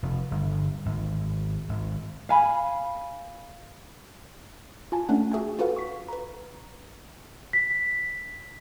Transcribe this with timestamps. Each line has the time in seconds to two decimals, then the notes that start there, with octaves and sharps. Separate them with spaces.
0.03 F1
0.31 G1
0.86 G#1
1.69 G#1
2.29 F5 G#5 B5
4.92 F4 G#5 A5
5.09 A3 C#4 D4 F#5
5.32 F#4 G#4 E5 G5 G#5
5.59 F4 F#4 A4 B4 F5 F#5
5.77 C#6 B6
6.08 B4 A#5
7.53 B6